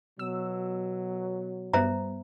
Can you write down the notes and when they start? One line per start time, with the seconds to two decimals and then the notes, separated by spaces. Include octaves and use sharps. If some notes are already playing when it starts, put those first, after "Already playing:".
0.19 B2 F#3 E6
1.73 G2 G3 B3 C5 E5 A#5